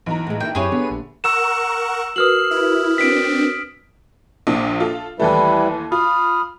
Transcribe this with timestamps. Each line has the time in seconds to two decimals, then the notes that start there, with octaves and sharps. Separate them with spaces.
0.06 B1 E3 A#5
0.27 A2 G#3
0.40 A#3 D#4 E4 G5
0.55 F#2 C4 E4 G4 G#4 B4 C#5
0.72 D3 B3 G4 D#7
0.90 A#1
1.24 A#4 F#5 C#6 E6 E7
2.16 F#4 A#4 B4 D#6 F6 C7 F#7
2.51 E4
2.98 C4 D4 B6 D7
4.47 A#1 A#2
4.80 F4 A4
5.20 D#2 E3 G3 A3 E4 B4
5.92 F4 B5 D#6 F6